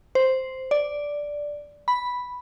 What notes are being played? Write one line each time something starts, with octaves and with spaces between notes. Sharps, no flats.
C5
D5
B5